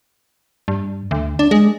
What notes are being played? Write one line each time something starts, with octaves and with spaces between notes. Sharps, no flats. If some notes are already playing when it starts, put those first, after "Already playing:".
G2
D2
D4
G#3